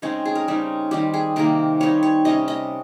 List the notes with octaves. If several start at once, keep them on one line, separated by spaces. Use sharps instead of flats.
C#3 G#3 C4 D#4 C#5
G#4
A#4
C#3 G3 C4 D#4
D#3 G3 C4 G4
G#4
C3 D#3 A#3 A#4
G3 C4 D#4 C#5
C#5
C3 G3 C#4 D#5
D#5